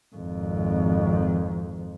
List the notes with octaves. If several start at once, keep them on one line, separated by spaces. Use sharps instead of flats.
G#1 F2